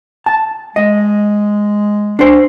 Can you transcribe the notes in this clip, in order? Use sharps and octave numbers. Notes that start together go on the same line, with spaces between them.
A5
G#3 D#5
D4 C5